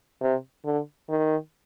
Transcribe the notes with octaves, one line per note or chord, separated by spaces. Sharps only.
C3
D3
D#3